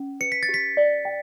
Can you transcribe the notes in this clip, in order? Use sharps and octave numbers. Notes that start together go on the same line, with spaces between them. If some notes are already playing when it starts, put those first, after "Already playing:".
Already playing: C#4
B4 C#7
B6
A6
G4
B6
D5
G5